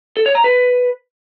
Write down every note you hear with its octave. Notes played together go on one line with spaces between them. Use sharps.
A4
C#5
A#5
B4